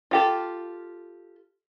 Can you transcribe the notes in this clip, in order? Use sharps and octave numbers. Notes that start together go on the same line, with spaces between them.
F4 G4 A4